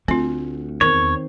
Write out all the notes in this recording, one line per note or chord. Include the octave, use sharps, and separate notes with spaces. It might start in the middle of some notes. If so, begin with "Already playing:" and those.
D2 A3 C4 F4
E2 D#3 C4 A#4 C#5